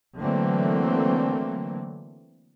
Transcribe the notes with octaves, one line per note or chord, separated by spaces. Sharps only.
D3 E3 F#3 A3 A#3 C4